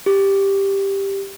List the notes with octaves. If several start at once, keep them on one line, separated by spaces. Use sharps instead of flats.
G4